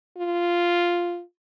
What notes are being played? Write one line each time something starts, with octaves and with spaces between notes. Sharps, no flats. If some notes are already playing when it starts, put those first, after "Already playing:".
F4